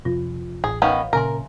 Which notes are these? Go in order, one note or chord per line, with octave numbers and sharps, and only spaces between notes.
F2 C3 F4
A1 G#4
D#3 B3 C#4 B4 C#5 F5
A#2 C#3 A#4 E5 G#5 C6